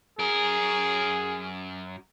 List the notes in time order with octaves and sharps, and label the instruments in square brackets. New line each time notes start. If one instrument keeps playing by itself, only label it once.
[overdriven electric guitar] F#2 A#4 [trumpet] G#4